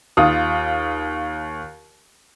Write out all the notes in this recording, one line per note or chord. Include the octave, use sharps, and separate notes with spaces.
D#2 F4 D#6